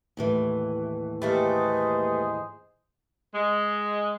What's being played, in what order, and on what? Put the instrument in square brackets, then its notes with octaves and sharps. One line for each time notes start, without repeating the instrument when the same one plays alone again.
[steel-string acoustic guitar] D#2 A2 E3
[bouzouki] G3 A3 A#3 [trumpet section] G#4 C5 D#5 [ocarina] B4
[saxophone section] G#3